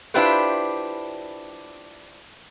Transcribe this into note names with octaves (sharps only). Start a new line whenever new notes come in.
D4 E4 F4 G4 B4 C5